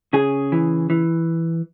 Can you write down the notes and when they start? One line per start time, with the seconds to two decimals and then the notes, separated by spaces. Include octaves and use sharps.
0.13 C#3 G#4
0.52 E3
0.90 E3